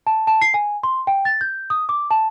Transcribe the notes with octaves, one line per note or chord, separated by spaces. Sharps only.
A5
A5
C7
G#5
C6
G5
A6
G6
D#6
D6
A5